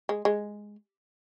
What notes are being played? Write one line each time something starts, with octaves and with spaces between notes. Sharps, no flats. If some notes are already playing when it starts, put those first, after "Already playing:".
G#3
G#3